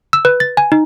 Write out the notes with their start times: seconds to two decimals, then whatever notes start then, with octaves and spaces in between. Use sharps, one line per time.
0.13 E6
0.25 B4
0.40 A6
0.57 G#5
0.72 D#4